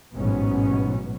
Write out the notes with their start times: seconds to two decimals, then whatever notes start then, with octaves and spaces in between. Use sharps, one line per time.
0.14 A1 G#2 B2 F#3 B3 C#4